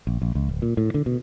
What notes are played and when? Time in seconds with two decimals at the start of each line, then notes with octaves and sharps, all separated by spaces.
0.07 A#1
0.22 A#1
0.35 C#2
0.49 D1
0.62 A#2
0.77 A2
0.94 D3
1.06 B2